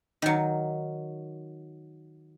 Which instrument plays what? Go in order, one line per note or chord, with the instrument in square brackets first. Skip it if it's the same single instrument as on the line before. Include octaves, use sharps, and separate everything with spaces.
[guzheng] D#3 F#3